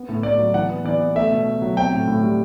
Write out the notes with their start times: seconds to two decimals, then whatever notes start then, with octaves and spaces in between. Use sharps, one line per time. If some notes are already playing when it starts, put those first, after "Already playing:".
Already playing: B3
0.09 A2
0.23 A2 D5
0.39 F#3
0.54 E3 F#5
0.69 B3
0.84 E3 D5
1.00 B3
1.16 A3 E5
1.31 B2
1.46 B2
1.62 F#3
1.77 C4 G5
1.92 A2
2.08 A2
2.23 G3